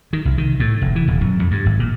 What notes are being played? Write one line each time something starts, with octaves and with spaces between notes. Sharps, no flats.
D#3
C2
D#3
A2
F1
E3
D#1
F#2
F2
G2
G#1
A#2